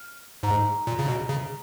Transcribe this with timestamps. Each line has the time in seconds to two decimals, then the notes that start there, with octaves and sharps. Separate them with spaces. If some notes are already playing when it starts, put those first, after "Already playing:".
Already playing: F6
0.43 G#2 A#5
0.87 A#2
0.99 C#3
1.08 B2
1.29 C#3